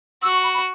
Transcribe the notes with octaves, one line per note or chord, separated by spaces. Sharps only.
F#4 E6
C#6
B5
B5